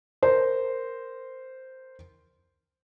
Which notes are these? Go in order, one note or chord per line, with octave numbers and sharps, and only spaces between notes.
A#4 C5